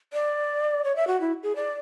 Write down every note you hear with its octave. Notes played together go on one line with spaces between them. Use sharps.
D5
C#5
E5
F#4
E4
G#4
D5